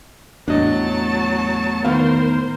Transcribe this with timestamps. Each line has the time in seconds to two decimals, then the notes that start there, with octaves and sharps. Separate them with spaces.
0.48 E2 A2 F#3 D4 D#5 A5
1.84 D#3 B3 A#4 C5 F5